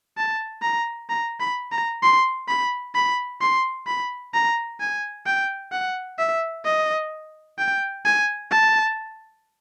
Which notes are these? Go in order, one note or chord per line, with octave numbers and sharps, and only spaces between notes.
A5
A#5
A#5
B5
A#5
C6
B5
B5
C6
B5
A#5
G#5
G5
F#5
E5
D#5
G5
G#5
A5